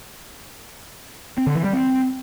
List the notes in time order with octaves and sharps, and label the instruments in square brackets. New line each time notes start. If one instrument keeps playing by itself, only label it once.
[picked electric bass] C4
D3
E3
G3
C4